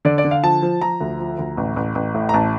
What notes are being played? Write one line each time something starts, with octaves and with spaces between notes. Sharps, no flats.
D3 D5
D5
D3
F5
F3 A5
F3
F3 A#5
D2
F3
D2
A1
A1
A1
A2
A#5
A1 A5